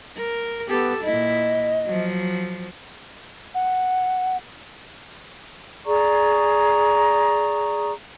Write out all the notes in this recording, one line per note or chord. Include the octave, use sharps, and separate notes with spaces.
A#4
B3 G4 A4
A#2 E4 D#5
F3 F#3
F#5
G#4 D5 A#5 C#6